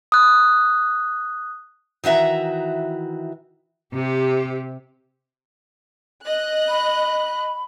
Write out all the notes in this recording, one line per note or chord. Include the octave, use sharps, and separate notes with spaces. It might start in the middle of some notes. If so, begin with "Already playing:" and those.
D#6 F#6
D#3 E3 F#4 E5 A#5
C3 G4
D#5 F#6
B5